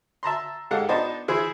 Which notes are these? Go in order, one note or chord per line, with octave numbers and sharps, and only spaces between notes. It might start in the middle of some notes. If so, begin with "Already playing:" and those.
E5 A5 A#5 C6
G#2 G#3 G4 A4 F5 F#5
B3 D4 D#4 C5 A5
E3 E4 G#4 C5